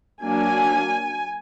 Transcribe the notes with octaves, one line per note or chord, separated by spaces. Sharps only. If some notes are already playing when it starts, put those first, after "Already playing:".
F#3 A#3 D4 G#5